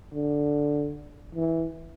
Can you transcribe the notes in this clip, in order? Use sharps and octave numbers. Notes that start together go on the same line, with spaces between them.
D3
E3